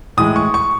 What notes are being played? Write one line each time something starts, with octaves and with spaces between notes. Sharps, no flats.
A2 E3 G#3 D#6
C#6
C#6